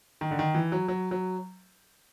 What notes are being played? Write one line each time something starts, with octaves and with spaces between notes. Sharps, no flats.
D#3
D3
D#3
E3
F#3
F#3
F#3